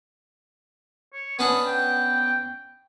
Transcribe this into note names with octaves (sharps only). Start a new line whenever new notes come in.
C#5
B3 C#4 D4 D#6
G5